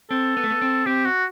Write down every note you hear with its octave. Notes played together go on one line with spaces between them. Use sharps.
C4 A4
B3
A3
B3
C4
C4 G4
F#4